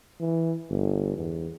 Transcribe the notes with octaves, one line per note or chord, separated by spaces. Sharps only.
E3
G1
E2